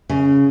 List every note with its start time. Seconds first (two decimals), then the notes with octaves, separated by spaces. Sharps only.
0.09 C#3